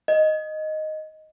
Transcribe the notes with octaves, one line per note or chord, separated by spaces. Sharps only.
D#5